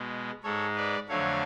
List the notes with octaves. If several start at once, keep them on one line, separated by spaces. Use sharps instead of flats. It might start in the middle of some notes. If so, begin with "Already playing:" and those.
Already playing: B2 G#3
G#2 G#3 A4 C#5
B4 D5
F2 D3 F#3 A3 C#5 F5